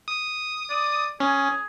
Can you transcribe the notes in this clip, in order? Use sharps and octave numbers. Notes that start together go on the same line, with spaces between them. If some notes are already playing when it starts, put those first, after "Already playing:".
D#6
D5
C#4 G#4